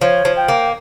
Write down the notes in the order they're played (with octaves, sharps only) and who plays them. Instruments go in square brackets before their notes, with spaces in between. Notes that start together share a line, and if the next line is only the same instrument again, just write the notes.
[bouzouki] F3 [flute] C#5
[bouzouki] F3
[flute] G5
[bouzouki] A#3